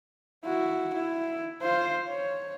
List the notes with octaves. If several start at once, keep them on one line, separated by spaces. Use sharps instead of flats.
E4 F#4
E4
F4 C5
C#5